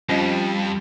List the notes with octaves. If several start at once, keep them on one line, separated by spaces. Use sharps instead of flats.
F2 F3 G3 C#4 D#5